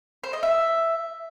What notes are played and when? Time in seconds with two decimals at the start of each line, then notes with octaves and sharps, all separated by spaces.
0.24 C5
0.33 D#5
0.43 E5